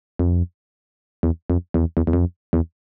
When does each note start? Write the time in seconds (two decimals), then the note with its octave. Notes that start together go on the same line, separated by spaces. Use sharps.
0.19 F2
1.23 E2
1.50 F2
1.74 E2
1.97 E2
2.07 E2
2.13 F2
2.53 E2